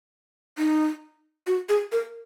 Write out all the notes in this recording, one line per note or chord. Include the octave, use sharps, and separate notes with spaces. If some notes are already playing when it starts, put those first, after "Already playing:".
D#4
F#4
G#4
A#4